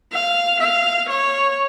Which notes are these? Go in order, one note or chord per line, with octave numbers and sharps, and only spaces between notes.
F5
F5
C#5